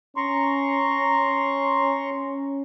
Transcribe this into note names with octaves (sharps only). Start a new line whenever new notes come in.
C#4 A#5 C6 C#6